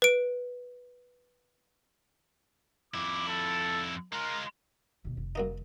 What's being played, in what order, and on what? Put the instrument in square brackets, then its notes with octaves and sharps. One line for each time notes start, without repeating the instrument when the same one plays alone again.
[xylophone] B4 D7
[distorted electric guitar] F2 E4 [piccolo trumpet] D6
[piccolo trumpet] A4
[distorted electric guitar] G#3 F4 [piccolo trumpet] A#4
[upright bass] D#2 B2
F1
[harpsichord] F#2 A#3 D#4